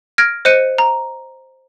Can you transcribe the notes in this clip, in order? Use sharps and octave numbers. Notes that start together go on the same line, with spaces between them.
F6 G#6 A#6 D7
C5 D#5 F#6 C#7 D#7
A#5